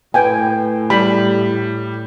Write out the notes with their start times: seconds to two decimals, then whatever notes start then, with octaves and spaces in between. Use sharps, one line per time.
0.14 A2 B4 G5 G#5
0.90 G3 B5